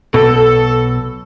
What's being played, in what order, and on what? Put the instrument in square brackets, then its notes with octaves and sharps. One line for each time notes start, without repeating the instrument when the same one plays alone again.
[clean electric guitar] B1 B2 [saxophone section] A4